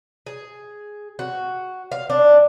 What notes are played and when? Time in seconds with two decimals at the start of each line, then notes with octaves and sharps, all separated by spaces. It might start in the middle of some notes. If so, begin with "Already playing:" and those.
0.26 G#4
1.19 F#4
1.92 F5
2.10 D4